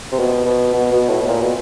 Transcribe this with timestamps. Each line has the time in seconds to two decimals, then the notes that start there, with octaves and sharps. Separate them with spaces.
0.12 C3
0.19 B2
0.46 B2
0.73 B2
0.92 B2
1.09 A2
1.21 B2
1.27 A#2
1.41 B2